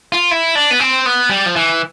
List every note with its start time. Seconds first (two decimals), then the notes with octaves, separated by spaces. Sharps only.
0.12 F4
0.31 E4
0.55 D4
0.71 B3
0.80 C4
1.06 B3
1.30 G3
1.46 F3
1.56 E3